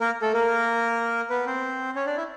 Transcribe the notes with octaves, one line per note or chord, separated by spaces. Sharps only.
A#3 A#4
A3 A4
A#3 A#4
B3 B4
C4 C5
C#4 C#5
D4 D5
E4 E5